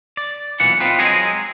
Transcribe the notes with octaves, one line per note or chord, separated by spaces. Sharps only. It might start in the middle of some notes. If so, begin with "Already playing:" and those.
D5
B1 A#2 E3 F#5
C4 D#4 F4 B4
F#3 G#3 C4 G#4 D#5